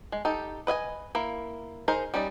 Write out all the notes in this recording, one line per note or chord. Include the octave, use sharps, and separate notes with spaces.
G#3
D#4 G4 A4
B4 D#5 E5 G#5
A#3 E4
D#4 G#4 A#4 C5
G3 C#4 D#4 D5